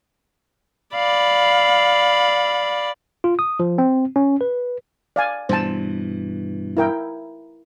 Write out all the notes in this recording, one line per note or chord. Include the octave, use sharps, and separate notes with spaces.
D5 F5 B5
F4
D#6
F3
C4
C#4
B4
D5 F5 G#5
G2 B2 E3 C5 A5
E4 A#4 G5